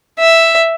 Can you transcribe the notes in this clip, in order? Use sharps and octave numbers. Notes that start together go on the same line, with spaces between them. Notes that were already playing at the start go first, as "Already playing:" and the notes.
E5